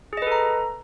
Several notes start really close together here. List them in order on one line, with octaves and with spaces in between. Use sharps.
G#4 D#5 B4 A4 A#5